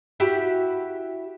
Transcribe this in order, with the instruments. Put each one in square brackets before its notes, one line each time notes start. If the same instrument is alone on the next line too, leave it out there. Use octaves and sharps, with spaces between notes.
[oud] E4 F#4 G4